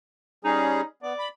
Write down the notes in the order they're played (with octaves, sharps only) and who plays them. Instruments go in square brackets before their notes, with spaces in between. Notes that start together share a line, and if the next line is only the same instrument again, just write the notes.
[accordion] G3 C#4 G#4 [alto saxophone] D#4
[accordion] B3 [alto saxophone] D5
[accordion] B5